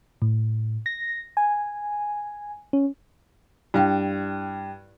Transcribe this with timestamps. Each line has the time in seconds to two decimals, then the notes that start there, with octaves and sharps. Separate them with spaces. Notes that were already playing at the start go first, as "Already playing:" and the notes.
0.22 A2
0.86 A#6
1.37 G#5
2.73 C#4
3.74 G2 E4 F5 G5